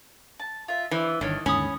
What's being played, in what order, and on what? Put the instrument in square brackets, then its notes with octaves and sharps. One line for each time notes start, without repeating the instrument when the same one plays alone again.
[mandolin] A5
F4 E5
[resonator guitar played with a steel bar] E3 [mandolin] C5 D5
[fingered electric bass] G1 [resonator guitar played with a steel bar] D#3 [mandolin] D4 C#5 F6
[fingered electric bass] D#2 G#2 D3 [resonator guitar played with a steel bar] C#4 [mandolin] B5 D#6